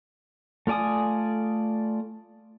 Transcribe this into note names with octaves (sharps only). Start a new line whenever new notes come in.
A3 F4 D5 G#5 D#6